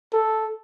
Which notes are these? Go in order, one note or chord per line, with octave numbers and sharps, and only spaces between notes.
A4